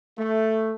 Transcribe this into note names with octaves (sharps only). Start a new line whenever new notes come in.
A3